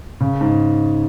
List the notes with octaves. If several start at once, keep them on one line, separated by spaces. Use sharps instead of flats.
C#3
G#2